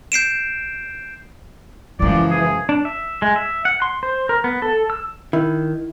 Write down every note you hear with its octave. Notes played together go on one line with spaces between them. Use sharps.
G6 C7 D7 E7
F#2 C#3 E3 F3 G#3 D5
G#4
D4
E5
G#3
E5
F#5
C6
C5
A#4
B3
A4
E6
D#3 E4